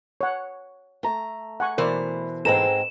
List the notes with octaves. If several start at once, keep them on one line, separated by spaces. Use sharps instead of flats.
C#5 F#5
A3 A#5
F#5 G#5 C#6
B2 E3 A#4 C5 D5
G#2 G#3 C4 A4 B4 A#5 E7